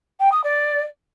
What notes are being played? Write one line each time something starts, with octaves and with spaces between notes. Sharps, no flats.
G5
D#6
D5